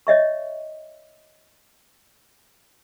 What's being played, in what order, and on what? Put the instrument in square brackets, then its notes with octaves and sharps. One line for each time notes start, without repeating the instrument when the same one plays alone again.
[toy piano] C#5 D#5 E5 C#6